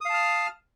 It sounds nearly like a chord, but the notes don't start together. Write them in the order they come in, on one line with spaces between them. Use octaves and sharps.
D#6 F5 A5 F6